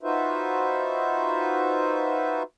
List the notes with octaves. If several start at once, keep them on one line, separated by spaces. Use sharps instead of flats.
D#4 F4 F#4 B4 C5 E5